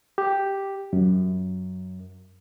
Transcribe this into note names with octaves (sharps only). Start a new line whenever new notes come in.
G4
F#2